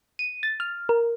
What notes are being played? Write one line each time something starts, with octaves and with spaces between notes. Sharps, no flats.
D#7
A6
F6
A#4